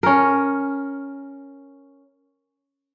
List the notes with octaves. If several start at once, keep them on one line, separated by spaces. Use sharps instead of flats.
C#4 A#4